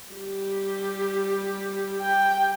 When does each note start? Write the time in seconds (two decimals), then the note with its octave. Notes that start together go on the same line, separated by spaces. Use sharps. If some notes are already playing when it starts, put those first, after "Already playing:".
0.11 G3 G4
2.01 G5